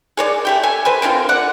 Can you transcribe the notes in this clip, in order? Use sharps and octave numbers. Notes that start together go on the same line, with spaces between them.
G#4 C#5 D5
A3 G4 G5
A4 G#5
B4 C5 G#5
D3 C4 C#4 F4
D5 F#5